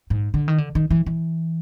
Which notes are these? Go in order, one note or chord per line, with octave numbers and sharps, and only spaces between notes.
G#2
D3
D#3
D3
D#3
E3
E3